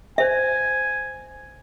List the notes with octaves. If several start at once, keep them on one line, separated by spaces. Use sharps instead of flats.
C5 E5 G#5